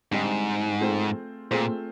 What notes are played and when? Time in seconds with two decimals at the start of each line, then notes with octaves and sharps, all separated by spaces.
0.11 G#2 D3 G3 C4 D#4
0.81 A3 C4 F4 G#4 C5
1.51 A#2 A3 C4 F4 G#4 C5